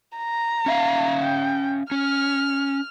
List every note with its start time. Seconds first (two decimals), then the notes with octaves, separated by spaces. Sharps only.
0.17 A#5
0.66 C#4 E5 F5
1.21 G5
1.91 C#4 F6